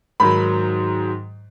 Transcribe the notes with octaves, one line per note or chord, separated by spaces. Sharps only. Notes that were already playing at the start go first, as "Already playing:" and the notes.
G#2 D#3 F#3 B5